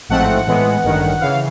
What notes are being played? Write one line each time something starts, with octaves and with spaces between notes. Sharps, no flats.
A1 G#2 F3 A3 C4 F#5
A2 E3 G#3 B3
A1 G2 D#3
C#3 E3 F5